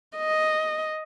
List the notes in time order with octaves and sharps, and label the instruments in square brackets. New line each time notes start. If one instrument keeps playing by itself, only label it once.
[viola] D#5